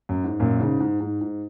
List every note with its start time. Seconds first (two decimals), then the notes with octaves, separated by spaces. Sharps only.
0.09 F#2
0.24 G#2
0.40 F#2 A#2
0.60 G#2 C#3
0.80 G#2
1.00 G#2
1.21 G#2